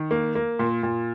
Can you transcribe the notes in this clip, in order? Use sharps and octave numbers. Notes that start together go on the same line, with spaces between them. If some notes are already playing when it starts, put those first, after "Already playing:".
Already playing: D#3
A#3
A#3
A#2
A#2